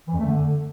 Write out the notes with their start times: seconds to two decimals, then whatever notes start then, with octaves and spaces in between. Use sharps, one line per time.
0.07 E3
0.13 F2
0.19 A3
0.25 D3